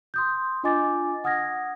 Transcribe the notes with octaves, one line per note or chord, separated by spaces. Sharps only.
C6 D#6 G6
D4 F4 D#5 G#5 D6 A6
F#5 D#6 F6 G#6 A#6